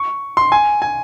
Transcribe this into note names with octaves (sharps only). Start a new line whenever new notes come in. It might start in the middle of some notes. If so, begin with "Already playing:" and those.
Already playing: C#6
C6
G#5
G#5